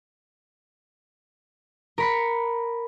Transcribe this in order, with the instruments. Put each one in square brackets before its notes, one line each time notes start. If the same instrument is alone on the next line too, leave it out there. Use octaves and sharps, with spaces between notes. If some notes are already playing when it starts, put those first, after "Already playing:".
[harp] A#4 B5 C#7